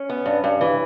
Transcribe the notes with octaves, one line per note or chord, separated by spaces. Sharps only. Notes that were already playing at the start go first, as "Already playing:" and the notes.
Already playing: C#4
B3
G2
G2
E3